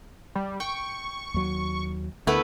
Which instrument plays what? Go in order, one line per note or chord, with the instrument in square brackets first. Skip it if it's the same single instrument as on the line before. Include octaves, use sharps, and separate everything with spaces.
[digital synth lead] G3
[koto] G5 [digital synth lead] C#6
[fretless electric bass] D#2 F#3
[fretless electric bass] D2 [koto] A3 B3 B4 [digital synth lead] E4